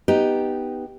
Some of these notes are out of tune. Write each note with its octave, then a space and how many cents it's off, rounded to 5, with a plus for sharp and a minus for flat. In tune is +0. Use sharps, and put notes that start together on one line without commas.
B3 +0 D#4 +0 G4 +0